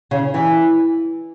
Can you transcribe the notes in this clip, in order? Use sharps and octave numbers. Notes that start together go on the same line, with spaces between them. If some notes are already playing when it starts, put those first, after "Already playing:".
C#3
E3